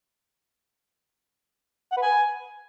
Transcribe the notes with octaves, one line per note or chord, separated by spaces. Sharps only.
F#5
B4
G#5